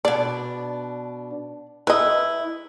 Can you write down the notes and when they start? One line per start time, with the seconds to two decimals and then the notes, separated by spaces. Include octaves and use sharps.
0.05 B2 D4 D5
1.87 E4 B4 D#5